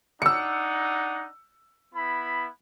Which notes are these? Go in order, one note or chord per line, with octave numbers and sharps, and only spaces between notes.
D4 D#4 F#5 E6 C#7
B3 E4 B5